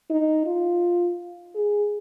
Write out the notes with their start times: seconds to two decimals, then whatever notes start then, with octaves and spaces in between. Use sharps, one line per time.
0.10 D#4
0.46 F4
1.55 G#4